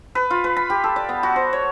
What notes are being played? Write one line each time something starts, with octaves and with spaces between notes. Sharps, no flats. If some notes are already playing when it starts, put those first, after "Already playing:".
B4
F4
B4
B5
G4
A4
D5
B3
F#4
C5
C#5